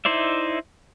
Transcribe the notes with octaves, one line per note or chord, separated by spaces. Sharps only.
D#4 E4 C5 D5 E5